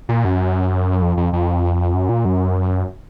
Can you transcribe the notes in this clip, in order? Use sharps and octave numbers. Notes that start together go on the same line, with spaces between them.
A#2
F#2
F2
F2
F2
F#2
A#2
F#2